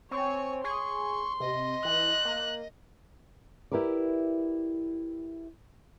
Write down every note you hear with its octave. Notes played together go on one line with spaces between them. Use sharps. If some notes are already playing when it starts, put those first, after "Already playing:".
C4 C#5 G#5 C#6
G#4 C6 C#6
C3 D#5
E3 F#6
A#3
E4 G4 A#4 B4 D5